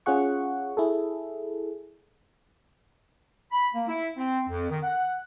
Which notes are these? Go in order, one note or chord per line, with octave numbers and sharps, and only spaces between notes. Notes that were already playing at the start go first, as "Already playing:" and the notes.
C#4 F4 G#4 F#5 C#6
E4 G#4 A4
B5
A#3
E4
C4
F2
D#3
F#5